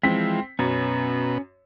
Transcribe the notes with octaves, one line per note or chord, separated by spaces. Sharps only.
E3 F3 G#3 C4 B6
F#2 B2 C#4 B4